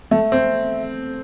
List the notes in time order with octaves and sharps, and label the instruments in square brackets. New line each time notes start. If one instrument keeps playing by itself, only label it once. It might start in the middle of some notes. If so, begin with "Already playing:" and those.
[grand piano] A3 [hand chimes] E5
[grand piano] C4